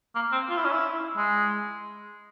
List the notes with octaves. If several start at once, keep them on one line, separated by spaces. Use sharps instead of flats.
A#3
C4
F4
E4
C#4
E4
G#3